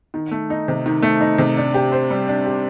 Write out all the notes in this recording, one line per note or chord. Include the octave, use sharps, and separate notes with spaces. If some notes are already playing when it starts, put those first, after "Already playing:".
D#3
A3
D#4
C3
D#3
A3
D#4
C3
D4
G4
C5
G3
D4
G4